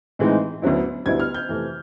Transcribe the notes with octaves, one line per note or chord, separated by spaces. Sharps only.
A2 E3 G#3 C4 D#4
D2 D3 F#3 B3 E4
D2 D3 G3 B3 E4 G#6
F6
G6
F2 C3 E3 A3